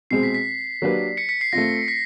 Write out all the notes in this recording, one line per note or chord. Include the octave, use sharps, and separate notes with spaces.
B2 G#3 C4 C7
B6
B6
F#3 A#3 D4 G4 B4
B6 C#7
B6 C#7
C7
A3 C4 F4 A#6
B6